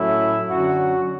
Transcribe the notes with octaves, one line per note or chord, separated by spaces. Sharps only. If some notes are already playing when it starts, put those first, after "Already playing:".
Already playing: A2 F#3 A3 C#4 E4
F#2 D3 F#3 C#4 F#4